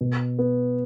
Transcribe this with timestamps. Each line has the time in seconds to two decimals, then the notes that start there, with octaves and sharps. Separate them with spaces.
0.01 B2
0.39 B3